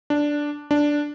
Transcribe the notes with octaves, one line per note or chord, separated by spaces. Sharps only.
D4
D4